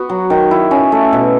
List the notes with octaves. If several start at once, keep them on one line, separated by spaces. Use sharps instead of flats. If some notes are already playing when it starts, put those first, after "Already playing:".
Already playing: B3 F#4
F#3
D#3
E4
C#4
A3
B2